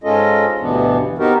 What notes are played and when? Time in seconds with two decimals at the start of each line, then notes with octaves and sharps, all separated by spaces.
0.04 G#2 G#3 C#4 F4 A4 D#5
0.61 D2 G2 B2 E3 B3 D4
1.19 B3 C4 D#4 F#4 G4 A#4